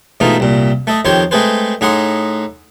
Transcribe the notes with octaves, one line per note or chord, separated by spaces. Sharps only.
G#2 B2 E3 A3 D#4 F4
C2 A#2
A3 A4 D#5
F2 D#3 G4 C5 C#5 C6
G#3 A3 C4 G#4 B4 C5
A2 D#4 G#4 F#5 C6